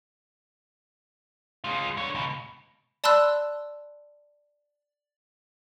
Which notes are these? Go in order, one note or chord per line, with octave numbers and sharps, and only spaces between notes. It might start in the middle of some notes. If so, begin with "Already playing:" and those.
G#3 F4
D3 C#5
C#2 B2
D5 A5 B5 C6 E6 F#6